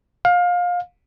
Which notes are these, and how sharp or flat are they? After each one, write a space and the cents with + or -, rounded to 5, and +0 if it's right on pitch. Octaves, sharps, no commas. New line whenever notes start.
F5 +25